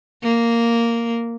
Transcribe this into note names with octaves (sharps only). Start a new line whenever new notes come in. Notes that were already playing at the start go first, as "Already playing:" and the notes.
A#3